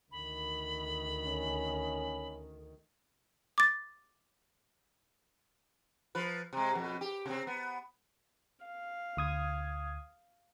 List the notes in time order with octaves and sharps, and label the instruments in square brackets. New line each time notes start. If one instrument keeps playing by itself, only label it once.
[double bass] D2 D#3 [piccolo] B5
[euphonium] C#4
[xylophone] D6 A6
[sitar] F3 B4
C3 G#3
F2 B2
G4
C3 C4
B3
[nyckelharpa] F5
[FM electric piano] D2 D#6 G#6